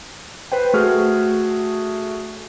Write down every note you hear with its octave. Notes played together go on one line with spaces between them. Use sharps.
B4 C5 G5
A3 F#4 G#4 F6